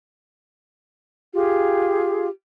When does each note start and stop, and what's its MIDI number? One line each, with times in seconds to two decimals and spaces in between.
1.33 2.27 65
1.33 2.27 67
1.33 2.27 68